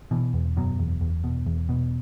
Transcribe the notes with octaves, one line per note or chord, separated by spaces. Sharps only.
B2 E3
E2
F#2 B2 F#3
E2
E2
B2
E2
B2